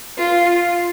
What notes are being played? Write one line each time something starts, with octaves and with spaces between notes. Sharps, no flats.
F4